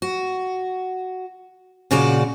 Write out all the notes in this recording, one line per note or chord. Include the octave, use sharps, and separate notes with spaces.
F#4
A#2 C#3 F#4 D5